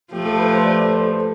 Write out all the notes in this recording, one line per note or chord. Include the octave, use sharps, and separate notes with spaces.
F3 A3 G4
A4
B4
C5
D5
D5
C5
A4